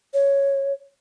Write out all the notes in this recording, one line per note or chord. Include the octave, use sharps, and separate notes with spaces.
C#5